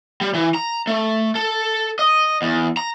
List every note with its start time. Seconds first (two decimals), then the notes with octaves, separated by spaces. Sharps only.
0.21 G3
0.34 E3
0.54 A#5
0.87 A3
1.35 A4
1.99 D#5
2.42 E2
2.77 A#5